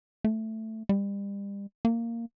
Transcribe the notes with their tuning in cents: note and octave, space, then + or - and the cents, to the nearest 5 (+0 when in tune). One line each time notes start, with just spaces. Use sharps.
A3 +5
G3 +35
A#3 -10